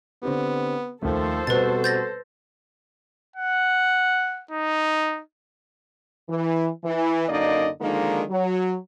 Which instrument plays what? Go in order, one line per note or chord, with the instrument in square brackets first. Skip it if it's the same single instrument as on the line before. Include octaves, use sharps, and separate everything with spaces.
[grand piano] D3 C4 G4 [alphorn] B3
[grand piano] D#2 A3 [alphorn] F3 [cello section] A4 C5
[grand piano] B2 G3 C4 [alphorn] F#4 [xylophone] B4 A6
[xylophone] G6 A6 A#6
[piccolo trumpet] F#5
D#4
[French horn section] E3
E3
F#2 D3 A#3 D#4 D5 D#5
D3 D#3 F3 G#3 A#3 D#4
F#3